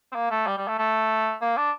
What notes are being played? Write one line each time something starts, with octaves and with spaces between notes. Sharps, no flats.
C4
A#3
A3
G3
G3
A3
A3
A#3
D4